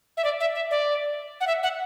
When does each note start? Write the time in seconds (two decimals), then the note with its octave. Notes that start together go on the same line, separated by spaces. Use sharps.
0.17 E5
0.24 D5
0.40 E5
0.55 E5
0.71 D5
1.41 F#5
1.47 E5
1.63 F#5